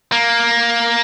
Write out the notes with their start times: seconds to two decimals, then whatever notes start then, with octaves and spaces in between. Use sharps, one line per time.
0.12 A#3